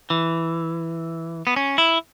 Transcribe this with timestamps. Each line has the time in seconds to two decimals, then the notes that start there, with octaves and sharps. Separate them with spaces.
0.10 E3
1.47 B3
1.56 C#4
1.78 E4